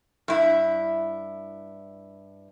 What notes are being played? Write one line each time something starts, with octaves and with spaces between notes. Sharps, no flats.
G2 E4